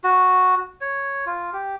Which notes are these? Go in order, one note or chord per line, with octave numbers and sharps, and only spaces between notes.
F#4
C#5
F4
G4